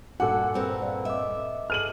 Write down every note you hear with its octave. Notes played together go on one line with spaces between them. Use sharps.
G2 A#2 F#4 A4 F#5 G#5 D6 F#6
B3 C4 G#4 A#4
D5 F5
D#5 E5 D6
G#4 A4 B4 F6 D#7 F#7